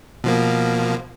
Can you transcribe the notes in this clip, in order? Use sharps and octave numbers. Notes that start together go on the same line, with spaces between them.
B2 F3 A#3